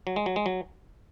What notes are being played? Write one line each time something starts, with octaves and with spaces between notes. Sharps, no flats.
F#3
G#3
F#3
G#3
F#3